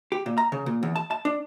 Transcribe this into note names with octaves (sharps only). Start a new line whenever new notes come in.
G4
A#2
A#5
C#3
A#2
E2
A5
A5
D4